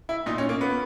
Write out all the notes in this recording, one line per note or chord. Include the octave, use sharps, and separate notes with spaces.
E4
A#2 D#4
C#4
A#3
B3